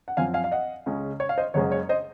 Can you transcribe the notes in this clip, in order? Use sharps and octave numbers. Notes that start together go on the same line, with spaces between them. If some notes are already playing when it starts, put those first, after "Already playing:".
F#5
F#2 F3 C4 F5 G#5
F5 G#5
F5
D#5 F#5
C#2 C#3 G#3 C#4
C#5
F5
C5 D#5
F#1 F#2 C#3 G#3 C#4 C#5
C#5
C5 D#5